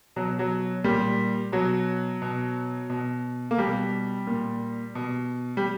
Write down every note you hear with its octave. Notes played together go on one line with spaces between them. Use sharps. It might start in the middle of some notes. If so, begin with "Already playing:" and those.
B2 F#3
F#3
A#2 G3
B2 F#3
B2
B2
A#3
B2 G3
A#2
B2
G3